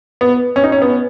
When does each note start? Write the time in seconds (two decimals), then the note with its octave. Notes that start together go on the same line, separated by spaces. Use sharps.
0.21 B3
0.56 C#4
0.64 D#4
0.72 C#4
0.82 B3